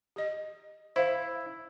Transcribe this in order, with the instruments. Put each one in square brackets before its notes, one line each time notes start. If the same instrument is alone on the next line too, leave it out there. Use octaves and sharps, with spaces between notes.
[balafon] G4 D#5
[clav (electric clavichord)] E4 [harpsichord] C5 [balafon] E5 F5